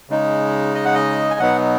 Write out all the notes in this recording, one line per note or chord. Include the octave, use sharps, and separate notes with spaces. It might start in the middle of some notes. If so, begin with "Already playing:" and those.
C#3 G#3 D#4
D#5
F#5
D#5
G#5
B2 F#3 B3 D#4 F#5